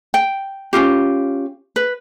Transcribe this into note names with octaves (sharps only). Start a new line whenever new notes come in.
G5
C#4 D#4 F4 G4
B4